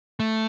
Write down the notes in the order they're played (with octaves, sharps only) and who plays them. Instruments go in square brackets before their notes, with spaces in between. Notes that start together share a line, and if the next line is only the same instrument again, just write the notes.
[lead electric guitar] A3